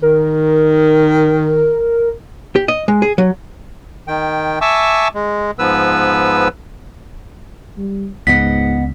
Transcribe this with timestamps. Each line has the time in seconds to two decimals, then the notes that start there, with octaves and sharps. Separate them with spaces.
0.02 D#3 A#4
2.56 G4
2.68 D#5
2.88 G#3
3.02 G#4
3.18 F#3
4.08 D#3 G5
4.61 E5 G#5 A5 C#6 D6 E6
5.15 G#3
5.59 G#2 F3 B3 B4 E6
7.77 G3
8.27 C#2 G#2 B3 D#5 F#5 B6